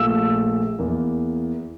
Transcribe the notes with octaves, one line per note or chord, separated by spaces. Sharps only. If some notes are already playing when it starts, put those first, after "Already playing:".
Already playing: A#1 A#2 A3 E6
E2 E3 A#3